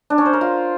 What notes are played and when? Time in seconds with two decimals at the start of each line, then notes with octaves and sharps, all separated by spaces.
0.10 D4
0.18 C#4
0.26 C5
0.33 A#4
0.41 F4